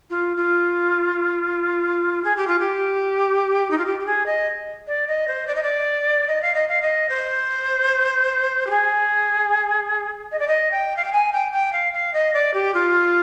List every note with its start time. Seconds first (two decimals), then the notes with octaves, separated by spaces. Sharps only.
0.10 F4
0.37 F4
2.24 G#4
2.37 G4
2.47 F4
2.60 G4
3.71 D#4
3.78 F4
3.86 G4
4.00 G4
4.06 G#4
4.26 D#5
4.87 D5
5.08 D#5
5.28 C5
5.47 D5
5.55 D#5
5.63 D5
6.28 D#5
6.42 F5
6.54 D#5
6.68 F5
6.82 D#5
7.09 C5
8.67 G4
8.70 G#4
10.32 D#5
10.39 D5
10.48 D#5
10.71 G5
10.97 F5
11.04 G5
11.12 G#5
11.33 G5
11.52 G5
11.73 F5
11.93 F5
12.13 D#5
12.34 D5
12.54 G4
12.74 F4